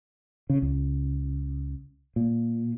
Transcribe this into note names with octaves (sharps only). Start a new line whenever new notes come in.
C#3
C#2
A#2